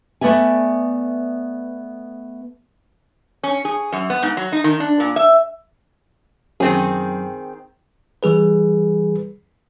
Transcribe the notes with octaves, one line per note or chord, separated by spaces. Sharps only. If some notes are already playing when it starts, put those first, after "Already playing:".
A3 B3 D5 E5 G#5
C#4
G#4
F#2
B3
G#2
F#3
D#4
D#3
D4
A#2
E5
F#2 D#3 C4 G#4
E3 G3 G#4 B4